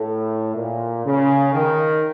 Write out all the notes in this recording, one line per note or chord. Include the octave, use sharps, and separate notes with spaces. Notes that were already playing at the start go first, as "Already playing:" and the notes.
Already playing: A2
A#2
C#3
D#3